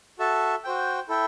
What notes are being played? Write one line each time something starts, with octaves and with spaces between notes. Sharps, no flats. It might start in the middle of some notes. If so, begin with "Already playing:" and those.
F#4 A4 E5 A5
F#4 C5 G5
E4 A4 E5 G5